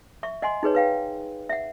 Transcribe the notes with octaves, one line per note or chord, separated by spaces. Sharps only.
E5 C#6
D#5 F#5 G#5 C6
D#4 G#4 B4 C#5
B4 F5 G5
E5 F#5